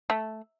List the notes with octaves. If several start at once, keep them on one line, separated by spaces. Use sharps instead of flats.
A3